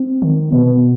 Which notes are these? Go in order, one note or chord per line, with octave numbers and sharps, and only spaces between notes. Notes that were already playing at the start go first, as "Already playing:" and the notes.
Already playing: C4
D#3
B2 B3